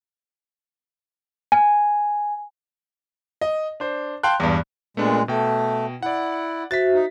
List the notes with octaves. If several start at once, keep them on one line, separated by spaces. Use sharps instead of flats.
G#5
D#5
D4 C5
F5 G5 A5 C6 F#6
E2 G2
A#2 G#3 A3 B3 D4
B2 A3 G5
E4 D5 F#5
F#4 C5 E5 A6 B6
D#4